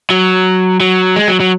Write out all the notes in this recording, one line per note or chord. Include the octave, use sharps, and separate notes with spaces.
F#3
F#3
G#3
F#3
F#3